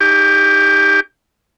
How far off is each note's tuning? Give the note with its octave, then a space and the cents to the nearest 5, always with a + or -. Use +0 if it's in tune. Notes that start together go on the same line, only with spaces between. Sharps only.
D#4 +0 G4 +20 D6 -25